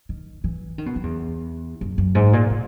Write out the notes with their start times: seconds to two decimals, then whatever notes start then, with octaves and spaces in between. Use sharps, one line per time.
0.09 D#3
0.44 E3
0.78 D#3
0.86 B2
0.96 F#2
1.03 E2
1.81 F#2
1.98 F#2
2.15 G#2
2.33 A#2
2.50 A#2